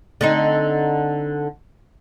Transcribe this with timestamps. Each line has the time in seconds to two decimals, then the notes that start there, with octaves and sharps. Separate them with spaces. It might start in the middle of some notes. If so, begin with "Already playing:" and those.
0.21 D3 C4 D#4